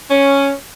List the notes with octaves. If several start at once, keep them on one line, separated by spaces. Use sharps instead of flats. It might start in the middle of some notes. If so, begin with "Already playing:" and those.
C#4